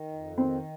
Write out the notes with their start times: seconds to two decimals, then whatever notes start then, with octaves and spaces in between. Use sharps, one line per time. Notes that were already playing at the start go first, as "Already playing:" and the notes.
Already playing: D#3
0.13 F2
0.37 D#3 C4